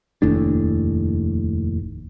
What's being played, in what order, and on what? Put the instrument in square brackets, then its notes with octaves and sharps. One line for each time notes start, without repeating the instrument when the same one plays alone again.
[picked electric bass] F1 D#2 A2 D4